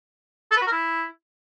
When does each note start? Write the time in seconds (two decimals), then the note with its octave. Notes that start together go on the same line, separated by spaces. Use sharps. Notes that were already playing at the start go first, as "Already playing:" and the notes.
0.51 A4
0.57 B4
0.62 F#4
0.67 A#4
0.72 E4